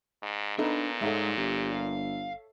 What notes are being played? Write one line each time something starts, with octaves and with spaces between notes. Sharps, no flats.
G#2
A#2 B3 D4 D#4 A4
G#2 G#3 A4 C#5 E5 F#5
G1 G4
F5